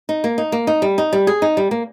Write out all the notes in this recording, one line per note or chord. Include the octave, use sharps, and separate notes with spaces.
D#4
A#3
D#4
A#3
D#4
G3
D#4
G3
G#4
D#4
G3
A#3